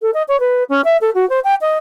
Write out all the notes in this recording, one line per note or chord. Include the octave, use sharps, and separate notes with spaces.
A4
D#5
C#5
B4
C#4
E5
A4
F#4
C5
G5
D#5